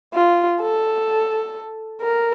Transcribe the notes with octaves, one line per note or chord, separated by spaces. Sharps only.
F4
A4
A#4